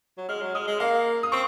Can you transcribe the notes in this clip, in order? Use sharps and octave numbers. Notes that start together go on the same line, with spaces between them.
F#3
G#3 F6
F#3
G#3 D#6
G#3
A#3 F5
D#6
C4 C#6